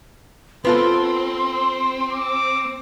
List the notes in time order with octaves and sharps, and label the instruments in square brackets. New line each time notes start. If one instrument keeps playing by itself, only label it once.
[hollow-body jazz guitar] B3 F4 A4 [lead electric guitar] C4 [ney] C6
[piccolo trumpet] D6